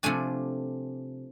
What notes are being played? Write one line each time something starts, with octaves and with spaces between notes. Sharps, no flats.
C3 F3 A3 D4 G#5